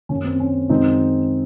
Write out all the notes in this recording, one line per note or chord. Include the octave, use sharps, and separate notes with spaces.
F#2 D#3 A#3 C#4
C4
C#4
F#2 D#3 G#3 C4 D#4